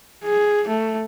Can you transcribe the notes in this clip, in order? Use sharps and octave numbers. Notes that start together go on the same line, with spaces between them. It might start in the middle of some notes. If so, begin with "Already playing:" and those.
G#4
A3